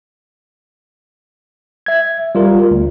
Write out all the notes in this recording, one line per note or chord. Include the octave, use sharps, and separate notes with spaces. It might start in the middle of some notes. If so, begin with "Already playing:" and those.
E5 G#6
G3 F4 A#4
D2